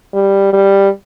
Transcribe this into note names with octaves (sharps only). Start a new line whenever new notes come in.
G3
G3